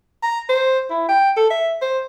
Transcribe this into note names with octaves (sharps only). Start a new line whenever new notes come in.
A#5
C5
E4
G5
A4
E5
C5